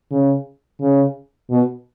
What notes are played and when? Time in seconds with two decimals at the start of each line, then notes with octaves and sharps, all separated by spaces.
0.11 C#3
0.80 C#3
1.50 B2